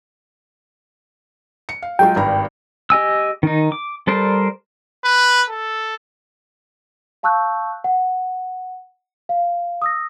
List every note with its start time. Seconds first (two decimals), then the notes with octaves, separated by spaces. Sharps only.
1.69 C#7
1.82 F5
1.99 F#3 G#3 F4 G5
2.16 G#1 G2 A#5
2.90 G4 D#5 G#5 E6
3.43 D#3 D#4
3.72 D6
4.07 G3 A4 A#4 C5 D5
5.04 B4
5.49 A4
7.23 F5 A5 C#6 E6 F#6 G6
7.84 F#5
9.29 F5
9.82 D#6 E6 A#6